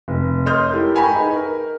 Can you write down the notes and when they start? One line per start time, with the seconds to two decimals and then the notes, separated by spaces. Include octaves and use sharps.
0.08 F1
0.46 C#5 D#5 C6 D#6 F6 G6
0.70 E4 G4 A4 A#4
0.95 G5 G#5 A#5 B5 C#6
1.15 D#4 G#4 B4
1.36 A#4